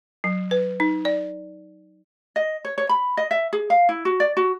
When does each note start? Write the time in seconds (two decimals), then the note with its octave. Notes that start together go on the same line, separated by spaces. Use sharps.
0.24 F#3
0.51 B4
0.80 D#4
1.05 D5
2.36 D#5
2.65 C#5
2.78 C#5
2.89 B5
3.17 D#5
3.31 E5
3.53 G#4
3.70 F5
3.89 E4
4.05 F#4
4.20 D5
4.37 F#4